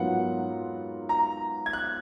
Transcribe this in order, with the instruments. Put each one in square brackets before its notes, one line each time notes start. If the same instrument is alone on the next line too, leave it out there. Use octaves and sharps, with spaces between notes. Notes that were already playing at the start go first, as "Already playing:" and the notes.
Already playing: [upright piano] G#2 F#3 B3 F4 A#4 [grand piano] F#5
[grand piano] A#5
G#6
F#6